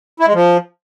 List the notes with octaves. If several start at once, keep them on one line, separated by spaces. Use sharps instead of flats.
E4
G#3
F3